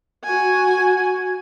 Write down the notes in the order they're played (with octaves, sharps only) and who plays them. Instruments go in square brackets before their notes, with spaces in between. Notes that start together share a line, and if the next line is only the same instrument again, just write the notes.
[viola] F#4 G#5